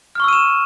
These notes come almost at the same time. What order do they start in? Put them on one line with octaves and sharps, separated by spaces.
F6 C#6 E6 D#7 E7